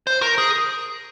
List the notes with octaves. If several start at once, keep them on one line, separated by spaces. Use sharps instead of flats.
C5
A#4
G#4